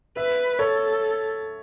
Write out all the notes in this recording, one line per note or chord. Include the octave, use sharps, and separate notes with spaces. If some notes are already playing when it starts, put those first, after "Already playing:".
B4 E5
A4 C#5